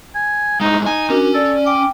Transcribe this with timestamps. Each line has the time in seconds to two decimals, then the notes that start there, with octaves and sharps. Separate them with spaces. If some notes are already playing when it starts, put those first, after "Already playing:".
0.15 G#5
0.61 A2 G#3 D#4
0.86 D#4 G#5
1.10 C#4 D4 F#4 A#4
1.35 A4 D5
1.67 G5 D6